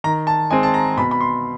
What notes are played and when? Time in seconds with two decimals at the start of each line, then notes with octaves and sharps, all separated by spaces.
0.04 D#3 A#5
0.27 A5
0.51 G#3 C4 G#5
0.63 A5
0.74 A#5
0.97 B2 B5
1.11 B5
1.21 C6